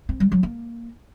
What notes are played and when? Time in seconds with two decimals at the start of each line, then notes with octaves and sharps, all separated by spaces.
0.09 C4
0.20 G3
0.32 F#3
0.43 A#3